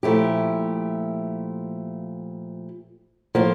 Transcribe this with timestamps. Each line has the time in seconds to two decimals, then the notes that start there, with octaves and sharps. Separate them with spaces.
0.03 A#2 F3 A3 E4 G4
3.35 A2 F3 A#3